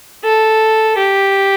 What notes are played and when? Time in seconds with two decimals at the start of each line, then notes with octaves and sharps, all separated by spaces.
0.24 A4
0.98 G4